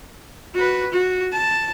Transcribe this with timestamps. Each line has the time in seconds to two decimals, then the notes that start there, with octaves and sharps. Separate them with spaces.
0.55 F#4 B4
0.92 F#4
1.32 A5